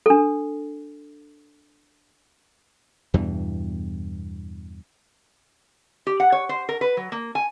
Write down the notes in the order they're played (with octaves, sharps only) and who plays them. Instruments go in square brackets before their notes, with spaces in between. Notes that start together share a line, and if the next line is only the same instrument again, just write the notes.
[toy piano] D4 A4
[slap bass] E2 G2 B2 E3
[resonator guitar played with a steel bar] G4
F#5
C#5
C5
A#4
B4
F#3
A#3
G#5